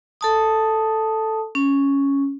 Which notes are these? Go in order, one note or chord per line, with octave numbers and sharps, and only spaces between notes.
A4 A5 D#6
C#4